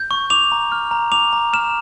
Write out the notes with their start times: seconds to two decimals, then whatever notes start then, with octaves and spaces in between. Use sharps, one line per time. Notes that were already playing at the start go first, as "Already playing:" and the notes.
Already playing: G6
0.11 C#6
0.30 D6 F7
0.52 A#5
0.72 F6
0.91 A#5
1.12 D6 F7
1.33 A#5
1.53 F6 E7